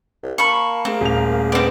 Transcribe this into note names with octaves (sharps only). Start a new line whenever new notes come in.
C2
A#3 A5 B5 C#6
A3 C4 G#4
D#1 F7
B3 C4 D5